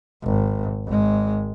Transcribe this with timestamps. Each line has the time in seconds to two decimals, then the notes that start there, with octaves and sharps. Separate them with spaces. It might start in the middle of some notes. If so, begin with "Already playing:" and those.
0.23 G#1
0.86 G#1 G#3